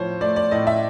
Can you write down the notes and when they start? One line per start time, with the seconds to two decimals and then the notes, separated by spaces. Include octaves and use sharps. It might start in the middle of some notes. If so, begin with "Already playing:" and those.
Already playing: A2 F3 C5 C#5
0.21 A3 D5
0.36 D5
0.51 A2 D#5
0.67 E5